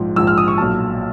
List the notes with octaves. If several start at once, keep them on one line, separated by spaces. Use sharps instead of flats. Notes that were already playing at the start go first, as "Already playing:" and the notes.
Already playing: A#1 G#2 F3
A#1 G#2 F3 E6
F6
D#6
C#6
B1 A#2 F#3 A5